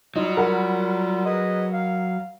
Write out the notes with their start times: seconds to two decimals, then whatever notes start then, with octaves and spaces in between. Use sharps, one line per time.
0.16 F#3 G3 D#4 F4
0.37 A#4 F#5 B5
1.25 G#4 B4 D#5
1.73 F5